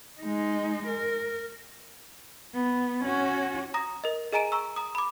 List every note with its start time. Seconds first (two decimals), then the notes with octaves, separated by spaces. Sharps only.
0.21 G#3 D#4
0.87 A#4
2.55 B3
3.05 C#4 F#4
3.74 A#5 D#6 A#6
4.04 A#4 D#5
4.33 G#4 D#5 G#5 A#5 D7 D#7
4.52 A#5 C#6 E6
4.76 A#5 D#6
4.95 B5 D6